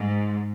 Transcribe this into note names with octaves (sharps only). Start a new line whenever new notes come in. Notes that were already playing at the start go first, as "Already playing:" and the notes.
Already playing: G#2